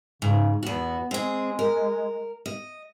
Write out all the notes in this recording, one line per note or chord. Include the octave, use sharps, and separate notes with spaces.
G#2 C#3
E2 B3 F#4
G#3 C4 G#4
A#4
D#5